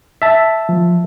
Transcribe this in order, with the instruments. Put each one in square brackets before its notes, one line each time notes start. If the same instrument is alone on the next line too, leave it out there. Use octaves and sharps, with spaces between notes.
[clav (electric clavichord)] E5 A5
[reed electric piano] F3